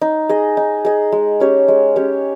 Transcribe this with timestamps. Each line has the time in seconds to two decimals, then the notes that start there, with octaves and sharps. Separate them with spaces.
0.01 D#4
0.29 G#4 D#5
0.57 D#4
0.85 G#4 D#5
1.12 G#3
1.40 C#4 G4 C#5
1.68 G#3
1.96 C#4 G4 C#5